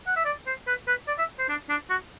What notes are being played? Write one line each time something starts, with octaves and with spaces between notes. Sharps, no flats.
F#5
E5
D5
C5
B4
B4
D5
E5
C5
D4
D4
F#4